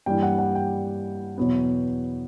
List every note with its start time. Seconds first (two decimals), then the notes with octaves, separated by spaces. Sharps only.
0.06 G2 E3 G3 A#3 G5
0.23 F#5
0.39 F#5
0.55 G5
1.38 E2 B2 F#3 B3